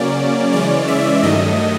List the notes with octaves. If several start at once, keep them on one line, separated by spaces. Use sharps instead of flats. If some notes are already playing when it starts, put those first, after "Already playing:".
Already playing: C#3 F#3 A#3 C#4 D5
C#3 E3 G#3 C#4 D5
E5
G2 D#3 F#3 A3 D#5